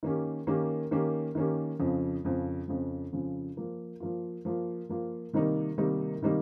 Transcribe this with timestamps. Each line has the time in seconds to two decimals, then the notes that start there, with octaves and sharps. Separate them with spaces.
0.03 D#3 A#3 C#4 G4
0.47 D#3 A#3 C#4 G4
0.91 D#3 A#3 C#4 G4
1.35 D#3 A#3 C#4 G4
1.79 F2 C#3 F3
2.25 F2 C#3 F3
2.68 F2 C#3 F3
3.12 F2 C#3 F3
3.57 F3 A#3 F4
4.00 F3 A#3 F4
4.45 F3 A#3 F4
4.89 F3 A#3 F4
5.33 C3 D#3 G3 A#3 D#4
5.78 C3 D#3 G3 A#3 D#4
6.22 C3 D#3 G3 A#3 D#4